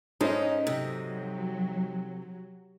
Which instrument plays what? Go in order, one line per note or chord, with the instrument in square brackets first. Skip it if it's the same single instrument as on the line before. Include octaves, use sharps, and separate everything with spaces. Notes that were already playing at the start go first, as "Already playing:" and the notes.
[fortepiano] G#2 D#5 [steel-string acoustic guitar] C#4 [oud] D#4 A4 C5
[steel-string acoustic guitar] C3 [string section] F#3